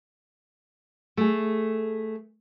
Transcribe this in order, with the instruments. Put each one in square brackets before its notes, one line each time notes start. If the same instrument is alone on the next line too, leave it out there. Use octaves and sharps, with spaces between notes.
[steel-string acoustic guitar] A3 G#4